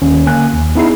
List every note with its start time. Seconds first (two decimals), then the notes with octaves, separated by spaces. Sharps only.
0.02 D#2 D#3 C#4
0.26 D3 A#3 G#5 F#6
0.53 D#2
0.75 B3 D#4 E4 G#4 C7